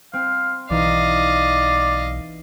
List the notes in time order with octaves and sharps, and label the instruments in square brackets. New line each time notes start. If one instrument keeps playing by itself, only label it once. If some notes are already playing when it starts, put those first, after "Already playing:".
[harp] C4 [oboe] F5
[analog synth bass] B1 [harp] E3 D#4 [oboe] D5 [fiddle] D#5 F5